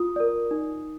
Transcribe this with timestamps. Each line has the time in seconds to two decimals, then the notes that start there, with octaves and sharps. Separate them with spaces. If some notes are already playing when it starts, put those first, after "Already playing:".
Already playing: F4 D#6
0.16 A#4 D5
0.51 D#4